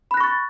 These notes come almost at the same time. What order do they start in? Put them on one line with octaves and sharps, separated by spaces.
B5 F#6 A#6 C#6 A6